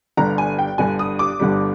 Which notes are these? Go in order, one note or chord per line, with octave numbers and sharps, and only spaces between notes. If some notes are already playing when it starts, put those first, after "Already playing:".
G1 G2 D3 G3 A#5
G#5
G5
G1 G2 D3 G3 G#5
D#6
D6
G1 G2 D3 G3